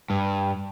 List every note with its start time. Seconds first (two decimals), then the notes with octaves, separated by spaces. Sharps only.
0.10 G2